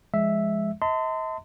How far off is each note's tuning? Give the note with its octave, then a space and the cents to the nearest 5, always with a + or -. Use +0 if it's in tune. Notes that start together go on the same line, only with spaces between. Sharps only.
F3 -15 G#3 +0 E5 +0
D#5 +45 A5 +40 C6 -30